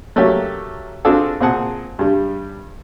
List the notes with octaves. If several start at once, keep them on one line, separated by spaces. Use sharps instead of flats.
F#3 A3 A#3 C#4 G4
C4 D4 F4 F#4 G#4 A4
A#2 C4 G#4 F#5 A5
G2 G3